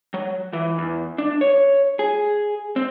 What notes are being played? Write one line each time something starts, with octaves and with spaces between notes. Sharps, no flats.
F#3
E3
E2
D4
C#5
G#4
C4